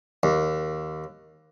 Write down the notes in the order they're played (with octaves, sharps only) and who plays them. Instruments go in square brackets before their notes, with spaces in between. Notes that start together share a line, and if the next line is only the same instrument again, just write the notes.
[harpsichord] D#2